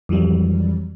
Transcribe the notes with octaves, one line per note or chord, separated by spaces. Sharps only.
F2 E3 F#3 G3